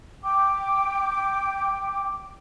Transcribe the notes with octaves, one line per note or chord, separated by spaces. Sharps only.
G5 D6